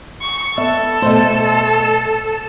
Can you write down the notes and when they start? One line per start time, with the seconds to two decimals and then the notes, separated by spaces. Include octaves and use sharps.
0.21 C#6
0.57 B3 A4 E5
1.02 B2 A3 C5